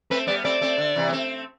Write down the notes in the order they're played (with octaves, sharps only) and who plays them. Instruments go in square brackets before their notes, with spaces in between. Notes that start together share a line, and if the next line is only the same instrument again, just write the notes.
[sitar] A3 C4 [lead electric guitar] B4
[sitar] G3 B3 [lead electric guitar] D5
[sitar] A3 C4 [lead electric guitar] D5
[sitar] A3 C4
D3
C3 E3
B3
A3 C4